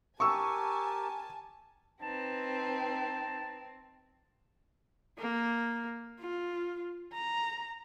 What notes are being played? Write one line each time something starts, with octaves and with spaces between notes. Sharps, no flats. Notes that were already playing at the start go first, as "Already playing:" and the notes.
G4 A#4 G#5 A5 C#6 E6
C4 D#4 B4 A5
A#3
F4
A#5